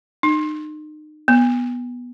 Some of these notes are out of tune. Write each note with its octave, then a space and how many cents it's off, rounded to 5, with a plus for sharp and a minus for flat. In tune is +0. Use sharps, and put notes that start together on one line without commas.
D#4 -35
B3 -10